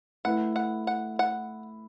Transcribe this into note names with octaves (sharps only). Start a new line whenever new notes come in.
A3 E4 B4 F#5
F#5
F#5
F#5